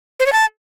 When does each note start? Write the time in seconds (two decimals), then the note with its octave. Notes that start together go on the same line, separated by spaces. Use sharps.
0.20 C5
0.26 C#5
0.33 A5